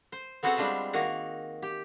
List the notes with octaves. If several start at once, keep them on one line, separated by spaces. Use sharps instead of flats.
C5
B3 C4 F#4 G#4 A4 F#5
G3 G#3 D4 F4 E5
D#3 A#3 F#4 G#4 A#5
G4